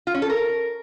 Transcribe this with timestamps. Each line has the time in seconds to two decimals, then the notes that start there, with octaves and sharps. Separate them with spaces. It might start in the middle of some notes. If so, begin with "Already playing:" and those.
0.07 F4
0.14 C#4
0.22 A4
0.30 A#4